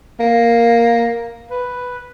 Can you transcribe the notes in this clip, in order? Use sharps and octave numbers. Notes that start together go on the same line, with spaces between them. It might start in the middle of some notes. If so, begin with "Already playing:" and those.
A#3
B4